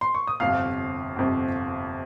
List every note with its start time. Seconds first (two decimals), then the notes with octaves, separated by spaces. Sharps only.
0.01 C6
0.15 C#6
0.27 D#6
0.40 G1 F2 C3 F5 F6
1.16 G1 F2 C3